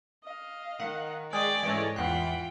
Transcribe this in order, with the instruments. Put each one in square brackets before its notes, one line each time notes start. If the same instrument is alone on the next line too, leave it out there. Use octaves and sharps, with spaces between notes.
[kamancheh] D#5 F5
[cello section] D#3 [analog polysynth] F#5
[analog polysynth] G#3 G#4 B6 [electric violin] D5 [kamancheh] G5 C#6
[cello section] G#2 C#4 D#5 [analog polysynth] E3 G#3 A3 [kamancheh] C#5 G#5
[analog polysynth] E2 F#6 [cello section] E3 F4 [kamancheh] F#5 [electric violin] G5